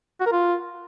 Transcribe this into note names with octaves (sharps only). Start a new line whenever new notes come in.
F#4
A#4
F4